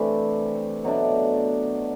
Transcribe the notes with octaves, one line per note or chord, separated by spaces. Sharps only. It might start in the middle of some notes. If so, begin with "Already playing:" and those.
Already playing: C3 E3 A3 D4
B2 F#3 A3 D4